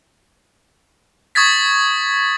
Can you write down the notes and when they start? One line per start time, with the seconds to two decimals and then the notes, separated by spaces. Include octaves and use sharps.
1.35 C#6 D#6 G#6 A6 B6